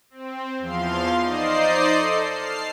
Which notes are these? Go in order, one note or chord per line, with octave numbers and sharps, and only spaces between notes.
C4
E2 F3 F5 C6
D#4 C5 D5 D#5 C7
A4
A5 F6 C7